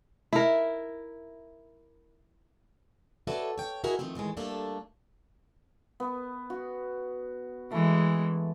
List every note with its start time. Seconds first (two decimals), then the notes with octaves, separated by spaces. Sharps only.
0.33 E4 A#4
3.27 F#4 A4 B4 C#5 D5 E5
3.58 C#5 G5
3.84 E4 F#4 G#4 A#4 D#5
3.99 D#3 F3 A3 C4
4.15 A2 D#3 E3 G#3
4.37 G3 A3 A#3 D4 A4
6.00 B3
6.50 F#4
7.72 E3 G#3 A3